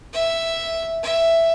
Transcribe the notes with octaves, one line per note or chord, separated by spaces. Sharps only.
E5
E5